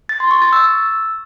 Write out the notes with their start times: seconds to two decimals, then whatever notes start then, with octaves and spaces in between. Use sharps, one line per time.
0.09 A6
0.20 C6
0.31 C#6
0.42 A6
0.53 E6